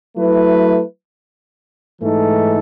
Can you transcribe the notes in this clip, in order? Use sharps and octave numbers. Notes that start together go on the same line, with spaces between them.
F#3 A3 E4 B4
G#2 E3 A3 D#4 A4